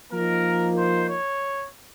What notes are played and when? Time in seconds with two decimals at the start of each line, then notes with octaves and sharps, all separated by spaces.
0.12 F3 A#3 D#4 A#4
0.77 C5
1.09 C#5